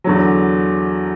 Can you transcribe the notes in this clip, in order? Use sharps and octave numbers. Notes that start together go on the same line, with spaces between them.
E2 D3 F#3